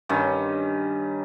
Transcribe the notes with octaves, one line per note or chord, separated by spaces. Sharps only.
G2 D#3 C#4